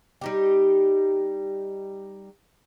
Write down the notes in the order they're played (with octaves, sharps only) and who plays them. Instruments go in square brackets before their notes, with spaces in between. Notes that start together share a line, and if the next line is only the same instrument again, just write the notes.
[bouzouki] G3 D#4 G4